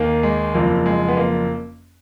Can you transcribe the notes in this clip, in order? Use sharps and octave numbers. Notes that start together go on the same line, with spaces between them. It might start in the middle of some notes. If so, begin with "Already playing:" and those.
Already playing: D#2 D#3 A#3
G#3
F#1 F2 F3 A#3
G#3
B3
A#3